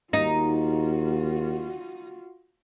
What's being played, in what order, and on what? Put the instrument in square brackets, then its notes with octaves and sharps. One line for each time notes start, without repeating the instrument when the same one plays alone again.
[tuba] D#2 [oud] D#4 [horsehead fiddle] F4 F#4